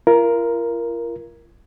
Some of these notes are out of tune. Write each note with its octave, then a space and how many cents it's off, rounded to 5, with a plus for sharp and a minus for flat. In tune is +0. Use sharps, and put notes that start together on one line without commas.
F4 -40 A#4 +5